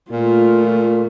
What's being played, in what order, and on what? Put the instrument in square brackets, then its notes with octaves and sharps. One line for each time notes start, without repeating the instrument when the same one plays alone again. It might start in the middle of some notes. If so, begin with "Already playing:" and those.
[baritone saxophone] A#2 [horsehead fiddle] A3 F4